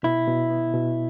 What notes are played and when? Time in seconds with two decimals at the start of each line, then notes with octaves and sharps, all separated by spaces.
0.03 B2 E4
0.27 B2
0.51 B3
0.74 B2